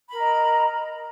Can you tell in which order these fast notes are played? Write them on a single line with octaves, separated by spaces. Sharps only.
B5 A#4 A#5 D#5